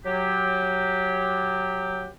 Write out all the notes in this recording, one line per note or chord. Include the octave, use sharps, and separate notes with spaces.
F#3 G4